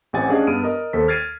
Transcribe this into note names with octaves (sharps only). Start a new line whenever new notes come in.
A1 C4 G4 F#5 G#5 A6
C#4 D4 G#4 D#5 F5 F#5
G2 B3 D#6 F6 D7 D#7
A#4 D#5 D#6
D#2 A4 C5 B6
F6 G#6 A6 C7 D7 D#7